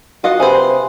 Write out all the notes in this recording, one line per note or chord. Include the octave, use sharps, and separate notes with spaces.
F4 F#4 D#5 F#5
C3 G#4 B4 C5